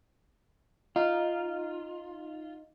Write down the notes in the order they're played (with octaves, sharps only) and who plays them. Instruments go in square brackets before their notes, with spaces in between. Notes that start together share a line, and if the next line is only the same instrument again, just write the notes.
[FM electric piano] D#4 [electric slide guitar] F4